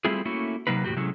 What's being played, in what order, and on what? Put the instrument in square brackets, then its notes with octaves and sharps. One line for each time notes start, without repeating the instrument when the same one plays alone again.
[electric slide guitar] G3 A3 C4 E4 F4 G#4
A3 A#3 C#4 E4 F#4
C3 F#3 A#3 D#4 B4
E2 A2 F#4 G4
C3 F#3 G#3 A3 C#4 E4